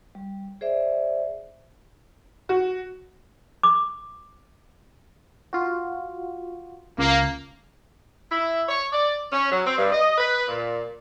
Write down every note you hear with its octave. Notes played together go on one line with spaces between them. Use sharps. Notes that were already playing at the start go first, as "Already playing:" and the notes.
G3
G#4 C5 D5 E5
F#4
D6
F4 F#4
C#2 A#3
E4
C#5
D5
C#4
F#3
C4
G2
D#5
B4
A#2